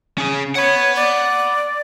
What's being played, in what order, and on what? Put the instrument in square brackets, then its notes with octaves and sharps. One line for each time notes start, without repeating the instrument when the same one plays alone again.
[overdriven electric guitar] C#4 G#4
[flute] C#5 [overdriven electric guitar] F#5 B5
[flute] D5